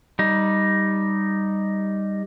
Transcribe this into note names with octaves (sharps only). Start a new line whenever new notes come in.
G3 D#4